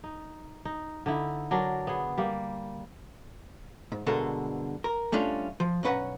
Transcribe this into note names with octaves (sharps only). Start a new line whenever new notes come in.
D#4
D#4
D3 D#4 E4
F#3 D4 A#4
B3 G#4
G3 A#3
G#2
G2 B2 D3 G#3 A4 A#4
A#4
G3 A3 C#4 D4 F4
F3
B1 G2 C#4 B4 F#5 A#5